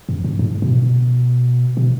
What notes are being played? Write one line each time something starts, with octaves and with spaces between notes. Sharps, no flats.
F#2
G2
A2
B2
B2